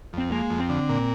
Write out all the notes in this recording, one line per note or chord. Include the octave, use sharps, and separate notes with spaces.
F2 C4
G#3 A#3
F2
C4
D3
A#2